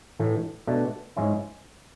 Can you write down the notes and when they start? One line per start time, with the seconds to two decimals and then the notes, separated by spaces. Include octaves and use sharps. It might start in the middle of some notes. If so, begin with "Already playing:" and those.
0.19 A2 E3 A3
0.67 B2 A3 D4
1.16 G#2 G#3 C#4 E4